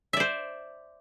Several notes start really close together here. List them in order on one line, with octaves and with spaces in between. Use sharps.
E5 D5 C5